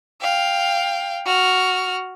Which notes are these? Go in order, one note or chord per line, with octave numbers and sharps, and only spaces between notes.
F5 G5
F#4 F6